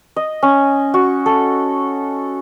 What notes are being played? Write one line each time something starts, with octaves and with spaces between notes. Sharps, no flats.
D#5
C#4
F#4
A4